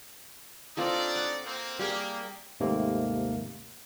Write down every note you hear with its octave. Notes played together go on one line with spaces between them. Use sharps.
C4 D4 D#4 F4 A4 D5
F#5
A#3 C4
G3 A#3 G4 G#4
D#2 G#2 C3 D#3 A3 A#3